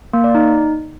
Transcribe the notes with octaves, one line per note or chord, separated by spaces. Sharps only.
A#3
D5
D#4